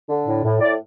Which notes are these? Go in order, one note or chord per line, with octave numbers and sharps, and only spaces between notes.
D3
A2
A2
A2 D5